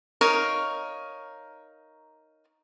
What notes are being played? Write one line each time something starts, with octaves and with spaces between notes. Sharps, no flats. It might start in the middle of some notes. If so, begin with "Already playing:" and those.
D#4 A#4 C#5 F5